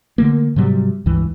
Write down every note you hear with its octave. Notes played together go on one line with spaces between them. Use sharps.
D3 A3 A#3
G#2 C3 F#3 G3
C#2 G2 E3